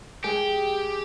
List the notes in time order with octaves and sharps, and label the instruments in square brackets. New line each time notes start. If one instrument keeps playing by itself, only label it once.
[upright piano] G#3 G#4 [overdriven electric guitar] G4